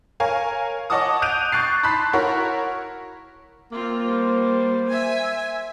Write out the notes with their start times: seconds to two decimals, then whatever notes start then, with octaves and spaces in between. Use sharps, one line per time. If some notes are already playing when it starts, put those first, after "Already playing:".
0.20 A#4 C#5 F5 G#5
0.90 C#5 D#5 F#5 A5 D6 D#6
1.22 F#6 G6 D7 D#7 F7
1.52 C#6 F#6 A6 C7
1.83 A5 B5 C6 F#6 B6
2.13 E4 F#4 A#4 C#5
3.72 A#3 C4 F4
4.07 G3 C5
4.89 E5 G#5